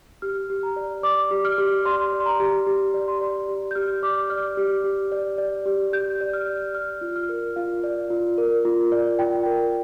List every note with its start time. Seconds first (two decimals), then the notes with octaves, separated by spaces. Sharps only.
0.22 G4 F6
0.50 G4
0.63 A#5
0.76 D5
1.03 D5 D6
1.31 G4
1.45 F6
1.58 G4
1.86 D5 C6
2.13 D5
2.20 C6
2.26 A#5
2.40 G4
2.67 G4
2.94 D5
3.08 C6
3.21 D5
3.48 G4
3.71 G6
3.75 G4 F6
4.03 D5 D6
4.30 D5 F6
4.57 G4
4.84 G4
5.12 D5
5.38 D5
5.66 G4
5.93 G4 G6
6.21 D5
6.33 F6
6.48 D5
6.75 D5 F6
7.01 F4
7.16 F6
7.29 A#4
7.56 F4 F5
7.84 D5
8.10 F4
8.38 A#4
8.65 F4
8.92 D5
9.19 F4 G5
9.46 A#4